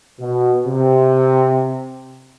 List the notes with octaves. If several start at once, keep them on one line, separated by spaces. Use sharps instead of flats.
B2
C3